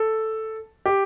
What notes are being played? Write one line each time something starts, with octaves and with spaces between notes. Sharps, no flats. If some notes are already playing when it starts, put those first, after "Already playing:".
Already playing: A4
G4